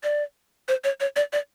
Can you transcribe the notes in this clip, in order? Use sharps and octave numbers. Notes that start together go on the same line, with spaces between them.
D5
C5
C#5
C#5
D5
D5